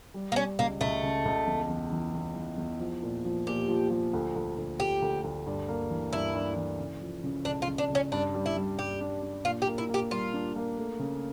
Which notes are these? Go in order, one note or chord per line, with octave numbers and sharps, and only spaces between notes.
G3
A#3
G3 C#4
C#2 A#3
C#2 A3
C#3
C#2
E2
E2
E3
E2
E3
E2
F3
A#2
F3
A#2 G4
F3
F3
D2
D2
D2
A3 G4
D2
D2
G2
A#3
E3
G2 E4
G2
E3
C#3
F3
C#3
C#2 D4
F4
C#3
D4
C#3
C#4
G2 D4
G3
E4
G3
G2 G4
D4
D4
A#2 F4
G4
A#3
E4
A#3
G4
G3 F4
D4
A#3
A3
C#3